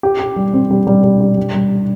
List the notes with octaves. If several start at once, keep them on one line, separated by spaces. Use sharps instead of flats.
G4
G4
G3
C4
G3
G3
G3
G4
G3
G3